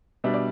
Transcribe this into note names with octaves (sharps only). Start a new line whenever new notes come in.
B2 G3 D4 E5
D5